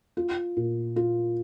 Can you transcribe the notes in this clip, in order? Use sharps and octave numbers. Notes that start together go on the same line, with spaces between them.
F4
A#2
F4